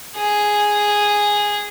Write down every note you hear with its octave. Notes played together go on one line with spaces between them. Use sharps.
G#4